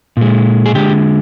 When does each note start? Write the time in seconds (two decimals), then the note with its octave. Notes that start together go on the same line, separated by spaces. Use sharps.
0.17 A#2 G#3
0.66 G#4
0.74 D3 G#3 G4